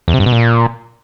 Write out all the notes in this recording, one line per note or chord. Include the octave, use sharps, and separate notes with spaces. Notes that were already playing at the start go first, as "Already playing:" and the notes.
E2
C3
G2
B2
A#2